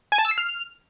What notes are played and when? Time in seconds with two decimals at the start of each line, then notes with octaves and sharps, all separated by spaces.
0.12 G#5
0.18 A5
0.25 E6
0.31 C7
0.38 F6